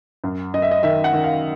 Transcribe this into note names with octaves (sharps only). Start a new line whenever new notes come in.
F#2
F#2 D#5
E5
D#5
D#3 E5
F#5
D#3
F5